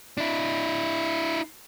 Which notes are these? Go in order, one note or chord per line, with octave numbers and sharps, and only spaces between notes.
D4 E4